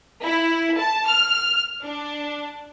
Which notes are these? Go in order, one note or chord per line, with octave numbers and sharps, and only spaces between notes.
E4
A5
F6
D4